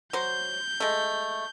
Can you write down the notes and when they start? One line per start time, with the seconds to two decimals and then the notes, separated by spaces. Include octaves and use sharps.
0.13 F#3 C5 G6
0.80 G#3 A3